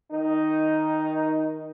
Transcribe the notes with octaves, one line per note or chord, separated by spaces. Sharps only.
D#3 D#4